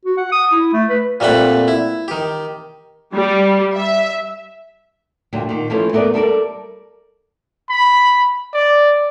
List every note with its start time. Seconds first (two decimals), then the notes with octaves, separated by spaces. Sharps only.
0.05 F#4
0.18 F#5
0.32 D#6
0.52 E4
0.73 A3
0.90 B4
1.20 A#2 G3 A3 C4 F#5 B5
1.68 E4
2.08 D#3 G4
3.14 G3
3.77 E5
5.33 D2 A#2 F#3 G3
5.49 A#2 D#3
5.70 E3 F3 A3 C#4 F4
5.93 A3 B3 A#4 D5
6.14 G3 A4 A#4 D5
7.70 B5
8.53 D5